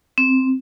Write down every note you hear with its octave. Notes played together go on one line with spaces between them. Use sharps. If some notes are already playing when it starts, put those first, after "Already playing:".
C4